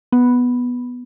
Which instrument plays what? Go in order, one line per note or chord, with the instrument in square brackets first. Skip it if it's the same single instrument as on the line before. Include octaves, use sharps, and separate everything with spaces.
[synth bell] B3